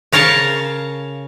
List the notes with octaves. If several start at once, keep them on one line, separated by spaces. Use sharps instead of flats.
C#3 A#4 C#5 F5 A5